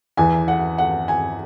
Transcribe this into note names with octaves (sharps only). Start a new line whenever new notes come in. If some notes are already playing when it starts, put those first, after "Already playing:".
E2 E3 G#5
F#5
F#5
G#5